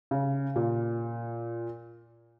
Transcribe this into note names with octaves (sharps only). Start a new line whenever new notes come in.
C#3
A#2